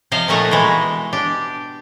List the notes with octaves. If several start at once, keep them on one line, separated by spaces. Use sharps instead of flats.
C3 F3 C5 D#5 F5
A#2 F3 A3 D#4 F#4
B2 E3 G#3
D4 G4